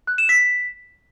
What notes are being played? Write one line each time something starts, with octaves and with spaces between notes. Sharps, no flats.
F#6
E7
B6